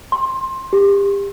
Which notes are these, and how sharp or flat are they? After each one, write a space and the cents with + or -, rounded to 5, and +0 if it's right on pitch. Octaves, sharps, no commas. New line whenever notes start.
C6 +20
G4 +30